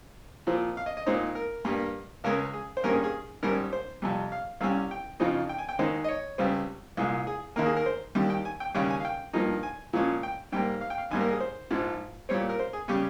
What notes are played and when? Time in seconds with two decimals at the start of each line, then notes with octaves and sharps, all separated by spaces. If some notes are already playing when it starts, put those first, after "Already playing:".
0.47 A#2 F3 C4
0.77 F5
0.86 D#5
0.97 D#5
1.06 A#2 G#3 C4 D#4 C5
1.35 A#4
1.65 G2 G3 A#3
2.24 C#2 C#3 G#3 C#4 A#4
2.53 G#4
2.77 C5
2.84 G#1 G2 G3 A#3 C#4 A#4
2.93 G#4
3.04 G#4
3.43 G#1 G#2 G3 C#4 A#4
3.73 C5
4.02 F2 C3 G3
4.32 F5
4.61 C2 C3 G3 C#4 F5
4.91 G5
5.20 F2 C#3 F3 C4 D#4
5.49 G5
5.58 G#5
5.69 G5
5.79 D#2 D#3 G#3 D#4 C5
6.04 D#5
6.09 C#5
6.38 C#2 C#3 G3 C4
6.97 C2 A#2 G#3
7.27 G#4
7.56 D#2 D#3 A#3 A#4
7.66 G#4
7.77 A#4
7.86 C5
8.15 D#2 D#3 G3
8.30 G5
8.45 G#5
8.60 G5
8.75 D#2 C#3 G3 C#4 G5
8.90 G#5
9.00 F5
9.05 G5
9.33 G2 F3 A#3 D#4
9.63 G#5
9.93 A#2 F3 G#3 C#4
10.23 G5
10.52 G#2 G3 A#3 G5
10.81 F5
10.90 G5
10.98 F5
11.11 G#1 G#2 G3 A#3 G#5
11.21 A#4
11.30 G#4
11.40 C5
11.71 A#1 G#2 F3
12.29 A#2 G3 C4 C#5
12.49 A#4
12.59 C5
12.73 G#4
12.88 C#3 G3 C#4 G4